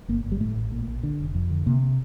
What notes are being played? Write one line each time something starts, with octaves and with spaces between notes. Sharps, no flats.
G1 A#3
G1
G3
A2 A3
A1
A#2
A#1
D3
F1
F2
D3
C3 A#3